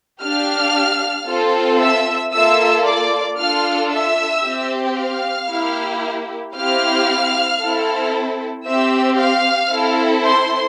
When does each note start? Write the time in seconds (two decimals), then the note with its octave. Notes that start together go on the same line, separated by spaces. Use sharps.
0.22 D4 G4 F5 F6
1.28 C4 F4 A4
1.80 E5 E6
2.32 A#3 F4 A4 E5 E6
2.85 D5 D6
3.39 D4 F4 A4 F5 F6
3.91 E5 E6
4.44 C4 G4
4.96 F5 F6
5.50 A#3 E4 G4
6.55 C4 E4 G4 F5 F6
7.60 C4 E4 A4
8.66 C4 G4 E5 E6
9.19 F5 F6
9.71 C4 E4 A4
10.24 C5 C6